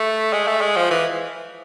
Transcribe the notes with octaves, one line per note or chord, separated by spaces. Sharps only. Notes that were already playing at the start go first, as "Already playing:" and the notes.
Already playing: A3
G#3
A3
G#3
F3
E3